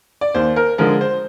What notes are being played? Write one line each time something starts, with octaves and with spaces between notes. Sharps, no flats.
D5
D#2 C5
A#4
D3 F3 G#3 A#4
C5